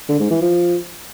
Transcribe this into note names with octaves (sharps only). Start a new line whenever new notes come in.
D3
G#2
E3
F3